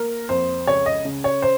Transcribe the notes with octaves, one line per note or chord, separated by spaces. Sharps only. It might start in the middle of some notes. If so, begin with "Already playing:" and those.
Already playing: A#3 A#4
F2 C5
C#2 C#5
D#5
C#3
C#5
C5